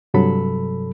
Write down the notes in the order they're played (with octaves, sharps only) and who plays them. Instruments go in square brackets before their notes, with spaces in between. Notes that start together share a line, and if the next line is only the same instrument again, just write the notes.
[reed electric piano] G2 C3 F#3 A4 B5